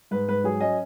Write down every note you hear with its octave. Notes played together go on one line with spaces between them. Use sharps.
G#2 B4
G#2 B4
F#3 G#4
C#4 D#5 G#5